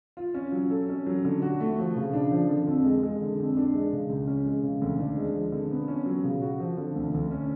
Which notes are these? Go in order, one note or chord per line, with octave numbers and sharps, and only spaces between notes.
F4
C#4
F#3
A4
C#4
F#3
D3
F#4
A3
F3
C#3
D4
F3
D3
F2
G#3
G#3
D3
F2
D4
G#3
C#3
C#2
C#4
G#3
C#3
D2
D4
G#3
F3
D3
B3
C#4
F#3
C#3
F#4
F3
D3
D2
D2
C#4